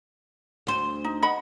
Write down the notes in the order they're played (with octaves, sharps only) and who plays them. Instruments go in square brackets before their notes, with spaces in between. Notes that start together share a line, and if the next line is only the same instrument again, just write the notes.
[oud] D2 C5
[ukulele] D#4
D#5 F#5 B5